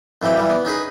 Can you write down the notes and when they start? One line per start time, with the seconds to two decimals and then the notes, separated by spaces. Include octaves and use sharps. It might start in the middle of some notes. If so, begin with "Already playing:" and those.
0.22 F2 E3 F#3 G4 G5
0.36 E3 G3
0.50 B3
0.65 C#4 D#4 G#4 B4